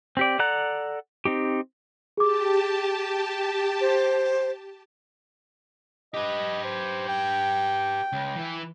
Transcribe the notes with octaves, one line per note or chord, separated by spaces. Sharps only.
C4 G4 D5
A4 D5 F#5 A#5 F#6
C4 D#4 G4
G4 G#4 A5 D6
C5
G4 B4 D#5
C5
G5
C#2
E3 E4